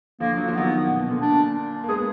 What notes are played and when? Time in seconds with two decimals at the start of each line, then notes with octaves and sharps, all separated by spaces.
0.20 D3 F3 A#3
0.37 F#3
0.44 F3 A#3
0.55 D#3 F#3 B3
0.87 B2
1.00 B2
1.10 A#2 D3
1.21 D4
1.84 A#3
1.88 G#3 B3 G#4